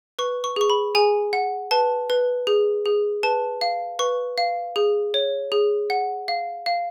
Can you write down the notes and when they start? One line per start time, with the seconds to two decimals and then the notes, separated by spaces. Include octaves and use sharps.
0.19 B4 C#6
0.44 C#6
0.56 G#4 C#6
0.70 B5
0.95 G#4 G#5
1.33 F#5
1.71 B4 A5
2.10 B4
2.47 G#4
2.86 G#4
3.23 B4 A5
3.61 F5
3.99 B4 C#6
4.38 F5
4.76 G#4
5.14 C#5
5.52 G#4
5.90 F#5
6.28 F5
6.66 F5